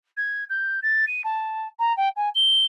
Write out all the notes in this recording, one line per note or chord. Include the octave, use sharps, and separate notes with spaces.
G#6
G6
A6
D#7
A5
A#5
G5
G#5
G7